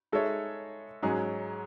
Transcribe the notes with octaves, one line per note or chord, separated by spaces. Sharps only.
G#3 D#4 A4 C#5 E5
G#2 F#3 C#4 G#4